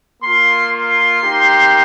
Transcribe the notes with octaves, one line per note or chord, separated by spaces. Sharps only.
A#3 F4 C6
C6
A#3 D#4 G4